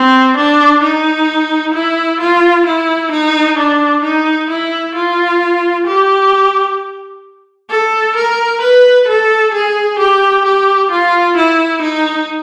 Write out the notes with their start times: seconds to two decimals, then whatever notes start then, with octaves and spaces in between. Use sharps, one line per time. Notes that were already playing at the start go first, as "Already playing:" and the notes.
Already playing: C4
0.37 D4
0.83 D#4
1.74 E4
2.20 F4
2.66 E4
3.12 D#4
3.58 D4
4.03 D#4
4.50 E4
4.95 F4
5.87 G4
7.70 A4
8.16 A#4
8.62 B4
9.08 A4
9.54 G#4
9.99 G4
10.45 G4
10.91 F4
11.37 E4
11.82 D#4